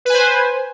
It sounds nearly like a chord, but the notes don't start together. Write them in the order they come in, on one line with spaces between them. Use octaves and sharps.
B4 G#5 C5